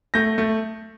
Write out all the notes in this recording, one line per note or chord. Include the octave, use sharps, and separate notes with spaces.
A3 G6 A#6
A3